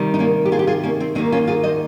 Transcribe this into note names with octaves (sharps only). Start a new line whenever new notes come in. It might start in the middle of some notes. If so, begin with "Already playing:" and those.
Already playing: C3 D#3 G3
D#4
A#3 C#4
G4
F4 G#4
G4
F4 G#4
A#3 C#4
C4
D#2 D#3 A#3 C4 D#4
C#4 F4
F4 G#4
C5 D#5